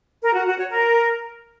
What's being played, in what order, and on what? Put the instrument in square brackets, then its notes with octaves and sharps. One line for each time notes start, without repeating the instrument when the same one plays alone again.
[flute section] A#4
F#4
F#4
C#5
A#4